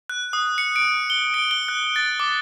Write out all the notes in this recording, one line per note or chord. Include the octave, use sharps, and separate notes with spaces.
F#6
D#6
C#7
D7
G7
D7
G7
F#6
A6
D6